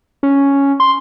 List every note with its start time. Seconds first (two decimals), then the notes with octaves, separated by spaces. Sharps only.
0.23 C#4
0.80 C6